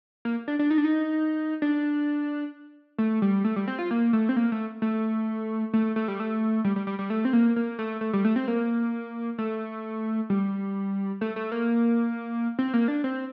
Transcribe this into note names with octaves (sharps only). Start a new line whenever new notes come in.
A#3
D4
D4
D#4
D4
D#4
D4
A3
G3
A3
G3
C4
F4
A#3
A3
C4
A#3
A3
A3
A3
A3
G3
A3
G3
G3
G3
G3
A3
C4
A#3
A#3
A3
A3
G3
A3
C4
A#3
A3
G3
A3
A3
A#3
C4
A#3
D4
C4